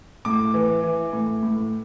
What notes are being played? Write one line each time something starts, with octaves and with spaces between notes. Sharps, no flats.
A2 D6
E3
E3
A2
A2